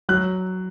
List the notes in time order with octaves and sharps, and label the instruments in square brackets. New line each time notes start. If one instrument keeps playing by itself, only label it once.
[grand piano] F#3 F#6